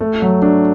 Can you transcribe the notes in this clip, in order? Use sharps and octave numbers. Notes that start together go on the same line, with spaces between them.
A3
F#3
D4